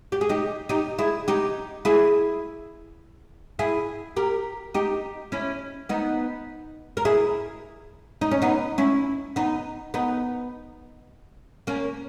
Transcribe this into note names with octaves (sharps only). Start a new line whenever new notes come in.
G4
G#4
D#4 G4
D#4 G4
E4 G#4
D#4 G4
E4 G#4
E4 G#4
G4 A#4
D#4 G4
C#4 E4
B3 D#4
A#4
E4 G#4
D#4
C#4
B3 D#4
C#4 E4
B3 D#4
B3 D#4
A#3 C#4